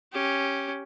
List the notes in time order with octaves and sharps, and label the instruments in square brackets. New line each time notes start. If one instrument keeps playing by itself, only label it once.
[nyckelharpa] C#4 G4